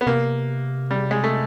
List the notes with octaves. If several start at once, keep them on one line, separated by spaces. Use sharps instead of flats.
B3
C3 A#3
G3
G#3
A3